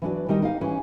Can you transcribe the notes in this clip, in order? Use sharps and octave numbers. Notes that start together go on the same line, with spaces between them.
E3 F#3 D4 F#4 B4 D5
D#3 G3 D#4 D#5
D#4 G4 F5
E3 C#4 E4 B4